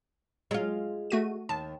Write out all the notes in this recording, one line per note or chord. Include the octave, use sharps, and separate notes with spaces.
F#3 G#3 F4
A3 F#4 D#7
D#2 A5